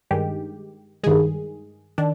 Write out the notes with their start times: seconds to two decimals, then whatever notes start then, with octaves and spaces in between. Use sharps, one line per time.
0.11 G2 D#3 G#3 G4
1.03 G2 D#3 G#3 G#4
1.98 D#3 D4